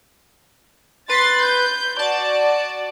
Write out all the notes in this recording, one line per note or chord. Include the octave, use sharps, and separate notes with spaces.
B4 C6 A6
G6
F#4 D5 A5